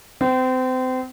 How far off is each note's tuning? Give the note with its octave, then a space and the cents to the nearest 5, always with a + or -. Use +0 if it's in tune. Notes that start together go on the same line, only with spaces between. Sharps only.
C4 -30